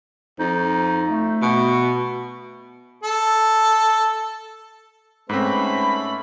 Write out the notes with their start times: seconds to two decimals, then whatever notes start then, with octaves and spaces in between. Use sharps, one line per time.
0.39 F2 D#4
1.07 A3
1.42 B2
3.03 A4
5.29 G#2 A3 C4 C#4 A4 B4 B5